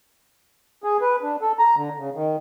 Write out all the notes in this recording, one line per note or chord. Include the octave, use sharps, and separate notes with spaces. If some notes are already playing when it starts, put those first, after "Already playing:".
G#4
B4
D4
A4
A#5
D3
C#3
D#3